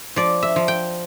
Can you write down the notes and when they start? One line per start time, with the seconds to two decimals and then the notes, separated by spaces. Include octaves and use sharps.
0.16 F3 D5
0.43 E5
0.56 F3
0.68 G5